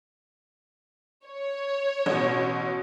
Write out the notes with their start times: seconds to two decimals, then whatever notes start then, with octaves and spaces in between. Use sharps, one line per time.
1.26 C#5
2.06 A1 B2